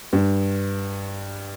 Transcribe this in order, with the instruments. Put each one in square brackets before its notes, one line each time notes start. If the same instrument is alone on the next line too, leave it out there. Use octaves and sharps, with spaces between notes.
[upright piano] G2